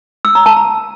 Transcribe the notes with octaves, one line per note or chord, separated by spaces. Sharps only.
E6
A#5
A5
A#5